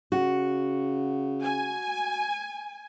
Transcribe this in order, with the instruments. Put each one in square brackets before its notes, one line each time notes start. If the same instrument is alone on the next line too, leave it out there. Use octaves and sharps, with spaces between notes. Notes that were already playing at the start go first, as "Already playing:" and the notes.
[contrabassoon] C#3 [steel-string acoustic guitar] F#4
[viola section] G#5